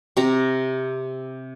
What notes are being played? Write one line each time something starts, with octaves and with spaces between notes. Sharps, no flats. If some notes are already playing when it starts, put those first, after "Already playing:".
C3 A#5